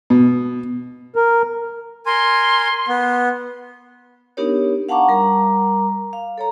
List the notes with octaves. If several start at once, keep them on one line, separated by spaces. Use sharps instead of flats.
B2
A#4
A#4 G#5 C6
B3
B3 D4 D#4 G4 A#4 C#5
F5 F#5 A5 A#5 C#6 D6
G3 A#4 A#5 D6
F5
A4 C#5 A#5